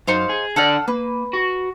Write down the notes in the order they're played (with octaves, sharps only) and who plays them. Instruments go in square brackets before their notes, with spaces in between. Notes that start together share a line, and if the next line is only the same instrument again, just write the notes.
[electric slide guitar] F#2 [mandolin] D#4 C5 F5
[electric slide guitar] G#4
[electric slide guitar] D3 D5 [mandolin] A4 F#5 F6
[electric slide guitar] A#3 [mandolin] B4
[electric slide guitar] F#4